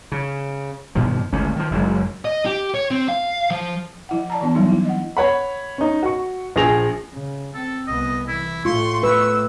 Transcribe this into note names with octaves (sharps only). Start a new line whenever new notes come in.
C#3
G2 B2 D#3 F3
G1 C#2 A3 C#4
D#3 F3
F#1 F#2 F#3 G#3
D#5
G4
C#5
C4
F5
F3
F3 E4 F#5
D5 A5 A#5
E3 B3 D4
F#3 G3 A#3 B3 D4 D#4
E4
D#5 F#5
C#5 F#5 B5
C#4 D#4
F#4 C#6
A#1 F3 G#4 A#6 F7
C#3
C4 A4
C2 B3 D#5
E3 E4
A2 A3 F4 C6 C#6
B4 E6